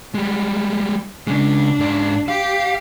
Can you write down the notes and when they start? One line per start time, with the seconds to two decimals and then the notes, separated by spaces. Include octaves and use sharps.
0.15 G3 G#3
1.27 C#3 G#3 D4
1.79 G#2 D5
2.28 G4 F5